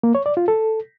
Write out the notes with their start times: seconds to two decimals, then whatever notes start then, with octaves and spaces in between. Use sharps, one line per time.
0.03 A#3
0.15 C#5
0.26 D5
0.37 F4
0.48 A4